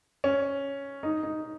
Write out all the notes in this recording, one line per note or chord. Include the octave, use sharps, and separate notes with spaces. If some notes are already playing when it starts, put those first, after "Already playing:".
C#4
D#4
D#4